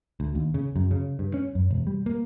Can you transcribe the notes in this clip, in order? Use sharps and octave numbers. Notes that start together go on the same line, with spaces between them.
D2
D#2
C#3
F#2
C#3
G2
C#4
F#2
E1
G3
A#3